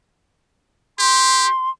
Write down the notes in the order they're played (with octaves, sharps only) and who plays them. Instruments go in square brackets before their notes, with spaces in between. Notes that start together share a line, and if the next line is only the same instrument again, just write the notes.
[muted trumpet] G4 [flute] C6